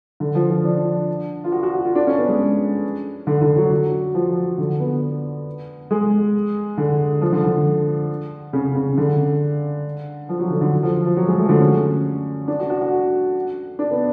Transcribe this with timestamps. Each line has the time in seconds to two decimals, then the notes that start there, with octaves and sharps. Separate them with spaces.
0.20 D3
0.35 F3
0.49 F3
0.64 D4
1.44 F4
1.52 F#4
1.63 F#4
1.74 F#4
1.85 F4
1.95 D4
2.07 C#4
2.18 B3
2.29 G#3
3.27 D3
3.42 D3
3.57 F#3
3.72 F#3
4.14 F3
4.58 D3
4.80 B3
5.91 G#3
6.78 D3
7.21 F3
7.32 D3
7.44 D3
8.53 C#3
8.75 C#3
8.98 D3
10.29 F3
10.39 F#3
10.50 D3
10.61 D3
10.83 F3
11.06 F3
11.17 F#3
11.28 G#3
11.38 A3
11.45 F3
11.49 D3
11.60 C#4
12.48 D4
12.59 F#4
12.70 F#4
12.81 F#4
13.79 D4
13.91 B3